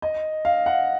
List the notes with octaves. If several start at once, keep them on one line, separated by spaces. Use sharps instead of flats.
D#5
F5
F#5